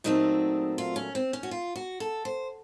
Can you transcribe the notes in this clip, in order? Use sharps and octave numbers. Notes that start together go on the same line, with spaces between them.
A#2 F#3 A3 C4 D#4
F4
C#4
C4
C#4
F#4
F4
F#4
A4
C5